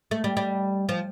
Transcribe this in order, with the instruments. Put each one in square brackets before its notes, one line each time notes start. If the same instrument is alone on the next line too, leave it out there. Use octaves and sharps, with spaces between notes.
[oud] A3
G3
G3
F3